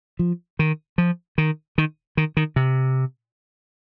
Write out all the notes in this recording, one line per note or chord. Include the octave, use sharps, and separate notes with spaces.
F3
D#3
F3
D#3
D#3
D#3
D#3
C3